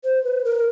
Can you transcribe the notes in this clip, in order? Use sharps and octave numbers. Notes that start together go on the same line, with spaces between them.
C5
B4
A#4